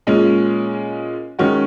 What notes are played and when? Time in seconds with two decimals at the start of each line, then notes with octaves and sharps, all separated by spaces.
0.07 A#2 G#3 C#4
1.39 D#3 G#3 C#4 F#4